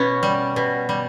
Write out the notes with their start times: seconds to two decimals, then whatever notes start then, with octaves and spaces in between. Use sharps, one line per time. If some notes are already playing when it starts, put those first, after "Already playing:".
Already playing: B2 B3 C#4
0.23 G3
0.56 B2
0.89 G3